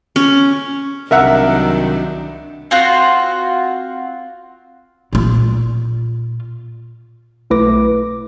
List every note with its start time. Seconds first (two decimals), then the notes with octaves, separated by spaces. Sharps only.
0.16 C#4
1.11 C2 D#3 F#3 D4 A#4 E5 F#5
2.71 C4 F4 F#4
5.13 A#2 F4
7.50 B1 A3 E4 B4 D6 A#6